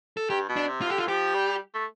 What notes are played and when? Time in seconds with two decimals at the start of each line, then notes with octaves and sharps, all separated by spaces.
0.17 A4
0.30 G2 G4
0.49 B2
0.56 D4
0.69 C3
0.81 F4
0.88 D3 G4
0.98 F4
1.08 F3 G4
1.34 G3
1.74 A3